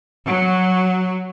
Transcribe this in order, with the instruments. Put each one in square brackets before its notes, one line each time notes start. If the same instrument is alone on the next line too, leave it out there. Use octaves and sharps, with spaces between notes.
[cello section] F#3